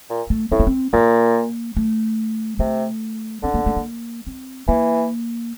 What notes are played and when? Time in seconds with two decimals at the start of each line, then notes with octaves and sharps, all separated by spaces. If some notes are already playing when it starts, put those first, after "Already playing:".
0.10 A#2
0.30 A3
0.51 A2 C4
0.60 A#3
0.67 C4
0.93 A#2 A#3
1.77 A3
2.59 C3 A3
3.43 D3 C4
3.54 A#3
3.66 A3
3.77 A#3
4.27 C4
4.68 E3 A#3